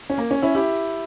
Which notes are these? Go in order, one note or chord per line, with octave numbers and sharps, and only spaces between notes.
C#4
A#3
C#4
C#4 E4
E4 G4